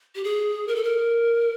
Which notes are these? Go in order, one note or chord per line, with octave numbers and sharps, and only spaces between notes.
G4
G#4
A#4
A4
A#4